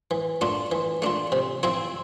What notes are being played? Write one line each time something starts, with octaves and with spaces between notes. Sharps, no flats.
E3
A3 D4 F4
E3
A3 D4 F4
C3
F3 C4 E4